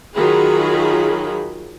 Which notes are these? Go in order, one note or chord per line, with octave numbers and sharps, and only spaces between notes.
D#3 F#3 F4 F#4 G#4 B5